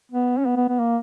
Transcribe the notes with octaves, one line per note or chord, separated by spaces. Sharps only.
B3
C#4
B3
B3
B3
A#3